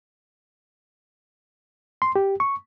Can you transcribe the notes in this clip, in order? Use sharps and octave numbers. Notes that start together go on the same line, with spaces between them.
C6
G4
C#6